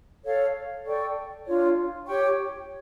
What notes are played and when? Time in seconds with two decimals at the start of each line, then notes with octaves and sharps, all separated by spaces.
0.24 A4 C#5 F5
0.85 A4 D5 G5 C#6
1.45 D4 F4 C#5
2.07 G4 C#5 G5 C#6